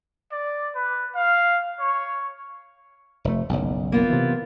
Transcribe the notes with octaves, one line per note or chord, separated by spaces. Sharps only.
D5
B4
F5
C#5
F1 A3
F#1 B1
A#3 B3 F4
C3 E3